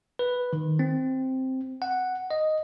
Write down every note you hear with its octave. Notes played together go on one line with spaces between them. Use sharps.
B4
D#3
C4
F#5
D#5